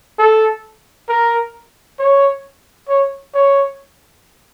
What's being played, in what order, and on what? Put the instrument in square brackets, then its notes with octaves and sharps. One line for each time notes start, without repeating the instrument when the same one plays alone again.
[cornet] A4
A#4
C#5
C#5
C#5